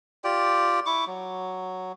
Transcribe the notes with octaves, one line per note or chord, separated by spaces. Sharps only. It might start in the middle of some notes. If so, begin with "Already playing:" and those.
F4 G4 D5 G5
E4 C#6 D6
F#3